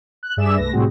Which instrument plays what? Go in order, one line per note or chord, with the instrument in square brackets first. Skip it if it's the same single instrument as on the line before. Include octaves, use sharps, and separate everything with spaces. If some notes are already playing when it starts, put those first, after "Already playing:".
[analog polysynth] F#6
G2 D4 G#4 D5 E5 E7
C2 A3 B4 A#6
A2 C3 G3 C4 F#4 G#4